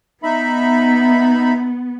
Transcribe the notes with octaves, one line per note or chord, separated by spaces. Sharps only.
B3 D#4 E5 B5